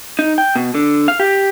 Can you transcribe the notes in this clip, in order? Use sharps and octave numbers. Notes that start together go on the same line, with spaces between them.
D#4
G5
B2
D3
F5
G4